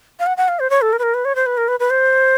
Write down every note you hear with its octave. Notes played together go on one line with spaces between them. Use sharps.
F5
F#5
F#5
F5
C5
C#5
A4
A#4
B4
A#4
B4
C#5
C5
B4
A#4
B4
B4
C5